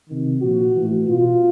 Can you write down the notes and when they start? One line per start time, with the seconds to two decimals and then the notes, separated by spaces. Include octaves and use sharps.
0.09 C3 D#3
0.42 A#2 F3 F#4
0.75 A2 E3
1.07 B2 F4